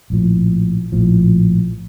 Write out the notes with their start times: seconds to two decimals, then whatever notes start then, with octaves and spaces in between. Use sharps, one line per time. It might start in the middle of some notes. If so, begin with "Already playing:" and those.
0.10 A#1 A2 F3
0.92 A#1 A2 F3